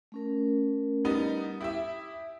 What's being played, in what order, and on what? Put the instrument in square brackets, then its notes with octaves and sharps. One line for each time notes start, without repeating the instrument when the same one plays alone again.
[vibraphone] A3 C#4 A#4
[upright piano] G3 B3 D#4
[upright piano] E4 G4 E5 [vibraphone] D#6